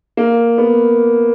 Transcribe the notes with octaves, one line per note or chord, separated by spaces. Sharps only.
A#3
B3